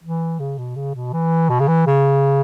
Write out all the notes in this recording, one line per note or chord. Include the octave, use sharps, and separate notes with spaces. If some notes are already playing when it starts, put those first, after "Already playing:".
E3
C#3
B2
C#3
B2
E3
B2
C#3
E3
C#3